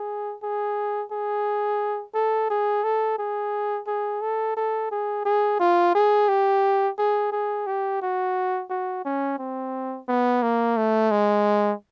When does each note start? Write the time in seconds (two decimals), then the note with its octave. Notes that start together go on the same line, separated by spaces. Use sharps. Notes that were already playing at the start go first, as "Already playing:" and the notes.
Already playing: G#4
0.43 G#4
1.11 G#4
2.14 A4
2.50 G#4
2.84 A4
3.18 G#4
3.87 G#4
4.21 A4
4.56 A4
4.91 G#4
5.25 G#4
5.59 F4
5.95 G#4
6.28 G4
6.98 G#4
7.32 G#4
7.66 G4
8.02 F#4
8.69 F#4
9.05 C#4
9.38 C4
10.08 B3
10.42 A#3
10.77 A3
11.11 G#3